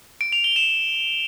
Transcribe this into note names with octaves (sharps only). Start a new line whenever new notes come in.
D7
F7
G7
E7